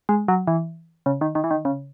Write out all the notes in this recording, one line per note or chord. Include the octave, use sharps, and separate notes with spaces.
G#3
F#3
E3
C#3
D#3
D#3
E3
D#3
C#3